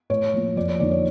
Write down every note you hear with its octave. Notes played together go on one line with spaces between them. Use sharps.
A2 C#5
F3 A#3
F2 D5
C#5
D3 F3 A#3 D#4 D5
C#5